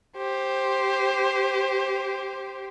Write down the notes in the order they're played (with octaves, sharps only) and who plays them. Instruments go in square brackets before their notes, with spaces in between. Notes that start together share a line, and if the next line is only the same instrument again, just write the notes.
[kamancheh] G4 C5